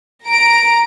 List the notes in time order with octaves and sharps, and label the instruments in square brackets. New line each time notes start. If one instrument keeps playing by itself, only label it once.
[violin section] A#5 D7